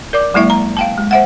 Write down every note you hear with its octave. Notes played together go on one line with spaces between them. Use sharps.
A#4 D5 D6
F#3 G#3 A#3 E4 E5
A#5
F5 G5 A5
G#3
C5 E5 F#5